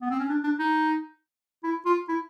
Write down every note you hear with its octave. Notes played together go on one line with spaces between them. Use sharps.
B3
C4
C#4
D4
D4
D#4
E4
F4
E4